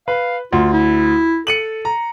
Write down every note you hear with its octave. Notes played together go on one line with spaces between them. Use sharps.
B4 F5
D2 F4
E4
A4 C#7 D#7 F#7
A#5